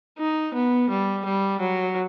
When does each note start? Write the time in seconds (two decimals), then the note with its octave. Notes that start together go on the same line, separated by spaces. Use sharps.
0.18 D#4
0.54 B3
0.90 G3
1.25 G3
1.60 F#3